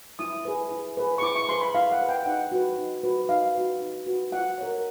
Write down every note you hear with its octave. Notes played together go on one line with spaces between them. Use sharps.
E4 D#6
G#4 B4
E4
G#4 B4
C#6
E4 D6
C#6
G#4 B4 C6
B5
E4 F5
F#5
G#4 B4
G5
D#4 F#5
F#4 B4
D#4
F#4 B4
D#4 F5
F#4 B4
D#4
F#4 B4
F4 F#5
A#4 C#5